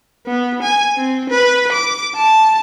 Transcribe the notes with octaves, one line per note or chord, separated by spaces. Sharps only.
B3
G#5
C4
B4
D6
A5